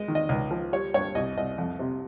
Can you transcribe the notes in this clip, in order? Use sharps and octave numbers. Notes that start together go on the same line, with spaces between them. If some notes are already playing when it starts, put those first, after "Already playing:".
Already playing: G#3 D#5
D#3
D#5
C#2
F3
G3 C#5
G2 C#5
C2 D#5
C2 D#5
F2
C3